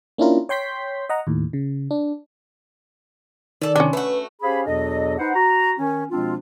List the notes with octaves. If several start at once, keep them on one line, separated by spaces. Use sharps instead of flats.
A#3 C#4 D4 E4 F4 A#4
C#5 G5 C6 G6 B6
D#5 F#5 A#5
D#2 A2
C#3
D4
D#3 A4 D5
C3 C#4 D4
A3 F#4 B4
C#4 G4 G#4 C5 F5 B5
E2 B2 F#3 D4 A4 D#5
D#4 B4 C5 F#5
F#4 A#5
D#3 C#4
B2 F3 G#3 C4 D4 F4